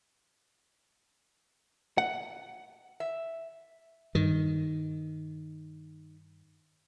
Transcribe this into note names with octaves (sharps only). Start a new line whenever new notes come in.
F#5
E5
G2 D#3